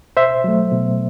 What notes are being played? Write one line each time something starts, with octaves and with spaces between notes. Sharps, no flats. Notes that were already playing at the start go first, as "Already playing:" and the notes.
B2 C5 E5
F#3 A3
B2